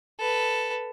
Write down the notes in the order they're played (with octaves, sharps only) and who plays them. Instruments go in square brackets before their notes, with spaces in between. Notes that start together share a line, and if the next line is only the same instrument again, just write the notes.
[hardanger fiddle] A4 B4